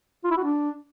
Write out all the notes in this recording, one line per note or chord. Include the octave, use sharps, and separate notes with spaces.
F4
E4
F#4
D4